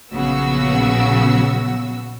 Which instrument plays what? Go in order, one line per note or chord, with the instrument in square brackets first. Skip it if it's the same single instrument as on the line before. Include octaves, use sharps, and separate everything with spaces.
[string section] A#1 C#3 F#3 B3 F#4 E6